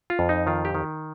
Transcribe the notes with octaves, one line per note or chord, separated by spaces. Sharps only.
F4
F2
D#4
D#3 F4
G4
D#3